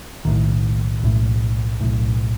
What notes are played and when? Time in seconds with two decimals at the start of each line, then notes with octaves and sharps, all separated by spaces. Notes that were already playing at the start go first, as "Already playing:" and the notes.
0.25 B1 A2 D#3
1.03 B1 A2
1.81 B1 A2